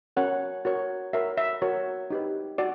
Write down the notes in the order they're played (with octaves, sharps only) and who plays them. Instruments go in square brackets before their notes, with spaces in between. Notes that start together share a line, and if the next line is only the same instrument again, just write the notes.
[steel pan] C#4 F#4 A#4 C#5 F#5
F#4 A#4 C#5
F#4 A#4 C#5 E5
E5
F#4 A#4 C#5
D#4 G4 B4
F#4 D5